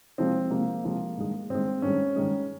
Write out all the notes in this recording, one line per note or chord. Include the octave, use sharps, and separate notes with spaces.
C3 F3 G#3 C4
C3 F3 G#3 A#3
C3 F3 G#3
G2 D#3 G#3
G2 D#3 G#3 C4
G2 D#3 G#3 C#4
G2 D#3 G#3